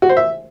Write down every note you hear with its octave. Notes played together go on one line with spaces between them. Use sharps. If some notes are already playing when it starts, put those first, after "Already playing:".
F#4
C5
E5